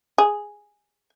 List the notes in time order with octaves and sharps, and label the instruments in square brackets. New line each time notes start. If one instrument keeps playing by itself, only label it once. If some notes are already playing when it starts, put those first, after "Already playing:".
[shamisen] G#4